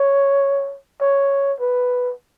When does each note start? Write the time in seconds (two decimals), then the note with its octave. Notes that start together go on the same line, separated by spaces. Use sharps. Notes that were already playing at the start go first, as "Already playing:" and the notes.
Already playing: C#5
1.01 C#5
1.60 B4